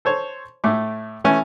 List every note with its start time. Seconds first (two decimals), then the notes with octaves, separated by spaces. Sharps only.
0.05 A4 C5 C#5
0.64 A2 A3 D6
1.24 E3 A3 C#4